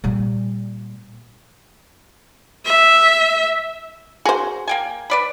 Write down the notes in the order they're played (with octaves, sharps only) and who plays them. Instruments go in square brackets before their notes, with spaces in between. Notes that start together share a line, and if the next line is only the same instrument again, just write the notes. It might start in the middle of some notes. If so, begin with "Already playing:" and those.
[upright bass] A#2 G3
[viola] E5
[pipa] F#4 [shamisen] G#4 C5
[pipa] A#3 G5 G#5
B4 D5 B5